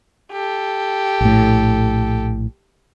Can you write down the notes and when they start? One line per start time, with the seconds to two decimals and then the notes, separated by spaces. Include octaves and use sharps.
0.32 G4 A4
1.21 A#1 A2